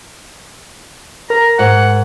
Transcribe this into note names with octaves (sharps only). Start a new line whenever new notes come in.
A#4 A#5
G#2 F#5